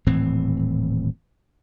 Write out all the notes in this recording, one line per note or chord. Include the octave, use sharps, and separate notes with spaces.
D#1 A2 E3 C4